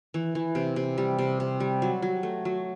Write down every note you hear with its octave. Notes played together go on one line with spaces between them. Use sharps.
E3
E3
C3
C3
G3
C3
C3
G3
F#3
F#3
A3
F#3